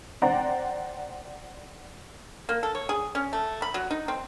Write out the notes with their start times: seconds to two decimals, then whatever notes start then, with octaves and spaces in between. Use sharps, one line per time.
0.22 C5 D5 F#5 G5 A#5
2.49 A#3
2.63 A4
2.75 C#5
2.89 G#4
3.15 C#4
3.33 A3
3.62 B5
3.74 F#3
3.91 D#4
4.08 C4